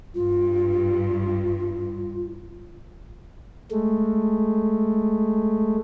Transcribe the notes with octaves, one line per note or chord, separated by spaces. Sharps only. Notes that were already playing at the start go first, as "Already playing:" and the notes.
G2 F4
G#3 A3